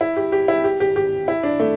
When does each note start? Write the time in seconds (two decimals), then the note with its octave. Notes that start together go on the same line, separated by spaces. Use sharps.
0.01 E4
0.16 G4
0.32 G4
0.48 E4
0.64 G4
0.80 G4
0.96 G4
1.28 E4
1.43 D4
1.60 A3